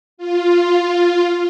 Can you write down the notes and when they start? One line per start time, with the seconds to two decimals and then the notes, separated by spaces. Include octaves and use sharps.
0.18 F4